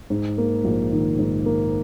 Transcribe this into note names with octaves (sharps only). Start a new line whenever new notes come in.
G#2
A#3
A#1
D#3
G#2
A#3